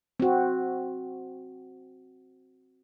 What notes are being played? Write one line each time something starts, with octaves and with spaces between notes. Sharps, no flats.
C4 F#4